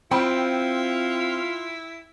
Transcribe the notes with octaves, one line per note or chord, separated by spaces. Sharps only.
C4 E4 F4 G5 B5